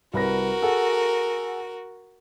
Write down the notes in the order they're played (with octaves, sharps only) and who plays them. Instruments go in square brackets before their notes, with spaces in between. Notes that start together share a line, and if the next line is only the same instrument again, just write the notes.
[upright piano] C2 B4 A#6 [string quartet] F#4 A#4
[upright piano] G#4 A4 F#5